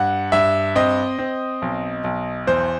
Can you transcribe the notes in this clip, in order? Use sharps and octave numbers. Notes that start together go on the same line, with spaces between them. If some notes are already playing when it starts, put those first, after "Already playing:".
Already playing: G2 F#5
G2 E5
C4 D#5
C4
B1
B1
E2 C5